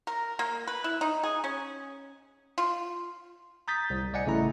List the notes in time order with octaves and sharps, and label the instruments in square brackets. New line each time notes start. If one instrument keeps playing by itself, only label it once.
[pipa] A#4
A#3
B4
E4
D#4
G#4
C#4
F4
[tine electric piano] A#5 D#6 G6 A6 B6
C2
C2 D5 D#5 F#5 G#5 C#7
A1 C#3 A3 E4 A#5